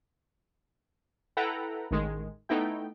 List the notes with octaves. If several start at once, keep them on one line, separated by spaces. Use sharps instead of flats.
E4 A4 B4 F#5 G5 A#5
A1 D#3 G#3
A3 B3 D#4 E4 G5